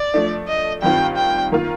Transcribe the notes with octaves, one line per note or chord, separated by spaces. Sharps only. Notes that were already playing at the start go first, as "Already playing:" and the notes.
Already playing: D5
F3 A3 D4
D#5
G2 D#3 G3 C4 F4 G5
G5
D#3 A#3 F4